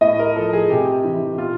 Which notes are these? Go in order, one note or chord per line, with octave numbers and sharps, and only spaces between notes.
A2 D#5
A#4
F3 A4
G#4
C3 G4
E3
A#2 F4